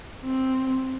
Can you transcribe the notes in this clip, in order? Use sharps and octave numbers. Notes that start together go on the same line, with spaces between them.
C4